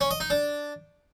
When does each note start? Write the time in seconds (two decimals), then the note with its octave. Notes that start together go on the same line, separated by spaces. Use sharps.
0.01 C#4
0.11 D#5
0.20 D#4
0.30 D4